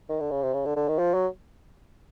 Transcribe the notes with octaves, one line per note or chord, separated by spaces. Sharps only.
D#3
D3
C#3
C3
C#3
D3
D3
D#3
F3
F#3